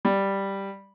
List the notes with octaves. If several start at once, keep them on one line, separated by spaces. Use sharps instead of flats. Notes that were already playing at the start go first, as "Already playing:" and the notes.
G3